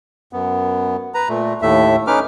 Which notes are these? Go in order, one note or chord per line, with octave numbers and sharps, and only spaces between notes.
F#2 B3
B4 A#5
A#2 A3
D#2 A2 A3 E5
C#4 D#4 B4 D6 F6